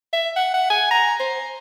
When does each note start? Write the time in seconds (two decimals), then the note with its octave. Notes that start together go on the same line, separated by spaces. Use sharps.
0.13 E5
0.36 F#5
0.54 F#5
0.70 G#5
0.91 A#5
1.20 C5